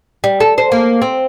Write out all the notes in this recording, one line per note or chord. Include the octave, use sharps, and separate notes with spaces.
G3
A4
C5
A#3
C4